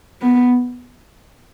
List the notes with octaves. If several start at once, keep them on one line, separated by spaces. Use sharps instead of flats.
B3